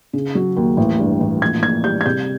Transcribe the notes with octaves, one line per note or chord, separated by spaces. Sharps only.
C#3
F#3
D#2
A1
G2
A1
A#1 G#6
A#1 G#6
G3 G6
G#6
C3 G6